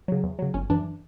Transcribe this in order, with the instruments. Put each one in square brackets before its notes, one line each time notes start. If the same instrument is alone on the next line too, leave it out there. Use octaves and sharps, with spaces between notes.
[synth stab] C#3 F#3
E2
C#3 F#3
G1 C#4
F#2 E3 D4